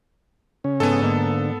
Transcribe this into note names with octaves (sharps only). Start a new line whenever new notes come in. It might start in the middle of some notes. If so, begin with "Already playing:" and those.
C#3 C#4
G#2 B3 A4 G#5 D#6
G#2 D3 A#3